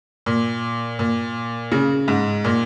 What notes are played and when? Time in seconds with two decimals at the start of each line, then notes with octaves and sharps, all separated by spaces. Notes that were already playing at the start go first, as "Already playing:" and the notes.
0.26 A#2
0.99 A#2
1.72 C#3
2.08 G#2
2.44 A#2